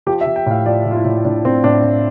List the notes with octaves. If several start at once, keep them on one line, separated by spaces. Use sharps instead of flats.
F3 G4
E5
F3
G5
A2 F5
F3 D5
F3
F4
E4
A2
A2 D4
A2 C4
A2 D4
A2